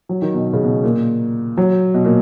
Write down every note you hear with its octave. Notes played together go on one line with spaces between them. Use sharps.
F#3
D#3
B2
C#3
B2
A#2
F#3
B2
A#2